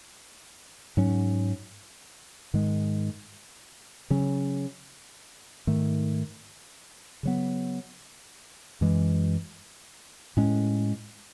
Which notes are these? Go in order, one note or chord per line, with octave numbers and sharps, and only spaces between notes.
G#2 F#3 C#4
G#2 D#3 G#3
C#3 F#3 C#4
G#2 D#3 A3
C#3 F#3 B3
F#2 E3 G#3
A2 G#3 C#4